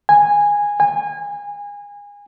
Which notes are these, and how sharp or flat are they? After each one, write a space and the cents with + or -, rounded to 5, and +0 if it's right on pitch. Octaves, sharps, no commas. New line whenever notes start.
G#5 -10
G#5 -25